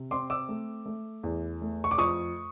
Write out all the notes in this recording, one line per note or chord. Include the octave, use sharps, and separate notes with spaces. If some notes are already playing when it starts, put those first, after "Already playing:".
Already playing: C3
C4 C6 D6
D6 E6
A3
A3
E2
A3
C#6
D6
F2 C#6 D#6